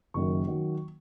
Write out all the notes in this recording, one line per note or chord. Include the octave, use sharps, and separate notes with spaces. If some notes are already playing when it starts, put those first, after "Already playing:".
F#1 F#2 D#3 F#3 C#6
D#3 F#3